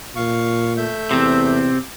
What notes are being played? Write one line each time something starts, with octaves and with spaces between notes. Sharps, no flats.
A#2 F5 C#6
A3 E5 G6
E2 C3 C4